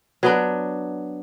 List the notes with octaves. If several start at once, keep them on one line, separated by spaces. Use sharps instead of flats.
F#3 B3 D4